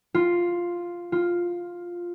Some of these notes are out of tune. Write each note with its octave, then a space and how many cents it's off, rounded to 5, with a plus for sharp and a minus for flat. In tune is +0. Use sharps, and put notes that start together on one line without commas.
F4 +0
F4 +5